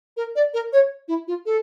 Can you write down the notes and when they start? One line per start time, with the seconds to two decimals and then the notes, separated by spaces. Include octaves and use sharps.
0.17 A#4
0.36 D5
0.54 A#4
0.73 C#5
1.08 E4
1.28 F4
1.46 A4